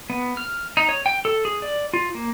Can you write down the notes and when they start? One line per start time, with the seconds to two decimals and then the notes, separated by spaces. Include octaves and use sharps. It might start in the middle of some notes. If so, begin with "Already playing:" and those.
0.10 B3
0.37 F6
0.77 D#4
0.89 C#5
1.06 G5
1.25 A4
1.45 G#4
1.62 D5
1.94 F4
2.14 A#3